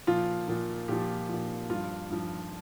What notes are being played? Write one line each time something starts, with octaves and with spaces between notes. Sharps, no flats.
A#2 F3 F4
A#2 F3
A#2 F3 G4
A#2 F3
G2 F3 F4
G2 F3